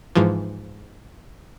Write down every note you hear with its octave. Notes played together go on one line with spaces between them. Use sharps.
G#2 E3 F3